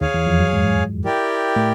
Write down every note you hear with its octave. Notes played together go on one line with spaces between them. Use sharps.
D#2 D#3 G#4 C#5 F5 G#5
E2 E3
F2 F3
F#2 F#3
G#2 G#3
E4 G4 A#4 D5 G5
A2 A3